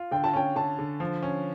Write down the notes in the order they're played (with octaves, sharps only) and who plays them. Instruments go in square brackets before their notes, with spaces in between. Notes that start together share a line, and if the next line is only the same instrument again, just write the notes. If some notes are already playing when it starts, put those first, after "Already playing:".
Already playing: [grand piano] F4
[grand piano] D3 [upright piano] G5
[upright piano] A5
[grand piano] C#4 [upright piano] G5
[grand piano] D3 [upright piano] A5
[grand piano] D3
F3
C#4